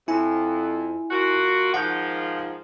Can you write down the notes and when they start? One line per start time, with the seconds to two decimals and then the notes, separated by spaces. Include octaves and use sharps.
0.08 F2 E4 G#5
1.11 A#3 F4 F#4
1.74 G#2 D#3 F3 F#5 G6